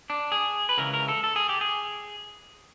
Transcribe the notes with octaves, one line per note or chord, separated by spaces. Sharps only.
D4
G#4
B4
C#2 C#3 E3 A#4
A#4
A4
A4
G#4
G4
G#4